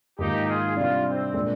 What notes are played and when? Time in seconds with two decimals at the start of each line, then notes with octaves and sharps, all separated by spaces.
0.19 G#2 D#3 A#3 D#4 F4 G4
0.47 F4 G#4
0.76 C3 G3 D4 F4
1.06 C4
1.34 A#2 G#3 D4